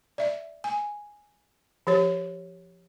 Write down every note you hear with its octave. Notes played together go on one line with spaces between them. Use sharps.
D5 E5
G#5
F3 G4 C#5